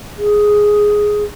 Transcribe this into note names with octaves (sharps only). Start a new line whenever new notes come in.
G#4